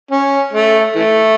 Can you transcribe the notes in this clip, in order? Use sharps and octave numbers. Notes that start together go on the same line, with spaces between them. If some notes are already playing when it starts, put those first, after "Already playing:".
C#4
A3
E3 A3